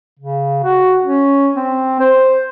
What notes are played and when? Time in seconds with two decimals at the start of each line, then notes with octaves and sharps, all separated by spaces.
0.19 C#3
0.64 F#4
1.03 C#4
1.56 C4
2.00 C5